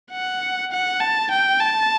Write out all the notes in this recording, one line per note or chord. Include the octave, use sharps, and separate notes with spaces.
F#5
F#5
A5
G5
A5